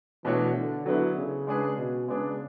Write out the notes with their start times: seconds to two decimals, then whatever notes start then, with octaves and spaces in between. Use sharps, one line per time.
0.25 B2 E3 A3 D4 F#4 C#5
0.55 D3
0.86 D3 F#3 B3 E4
1.17 C#3
1.47 G#3 D4 G#4 B4
1.77 B2
2.08 C#3 G#3 B3 D4 G#4